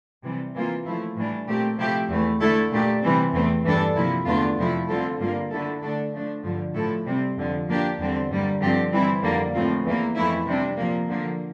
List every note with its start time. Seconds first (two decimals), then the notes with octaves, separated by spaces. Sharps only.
0.23 C3 E3 G3
0.54 C3 E3 A#3 F4
0.85 F3 A3 E4
1.16 A2 E3 G3 D4
1.47 A#2 A3 C4 G4
1.78 C3 F3 A3 E4 G4
2.09 E2 E3 A3
2.40 D3 A3 E4 A4
2.71 A#2 A3 D4 G4
3.02 C3 E3 G3 C4
3.33 E2 E3 A3 C4
3.65 G2 E3 G3 D4 A4
3.95 C3 F3 A#3 E4
4.26 E2 D3 A3 D4 F4
4.57 F2 C3 F3 A3 E4
4.88 D3 G3 C4 F4 A4
5.19 G2 D3 G3 A#3 F4
5.51 D3 A3 E4 A4
5.82 D3 A3 D4 A4
6.12 F3 A3 D4
6.43 G2 D3 F3
6.74 A2 F3 A3 E4 A4
7.06 C3 G3 C4
7.36 F2 D3 F3
7.67 F3 A#3 D4 G4
7.98 E2 D3 G3 C4
8.29 G2 D3 G3 A#3
8.61 G2 D3 F3 C4 G4
8.92 E3 G3 C4 E4
9.22 F2 D3 G3 A#3
9.53 A2 F3 C4 F4
9.84 E2 E3 A#3
10.15 F2 E3 A3 E4
10.46 C3 G3 D4
10.77 A#2 F3 A#3
11.08 D3 F3 A#3